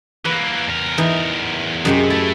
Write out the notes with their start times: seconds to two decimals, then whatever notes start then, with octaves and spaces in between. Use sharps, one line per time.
0.25 E3 A#3 B4
0.68 E2 A#4
0.98 E3 D#4
1.85 F#2 C3 G#3 G4
2.10 A3 E4 A4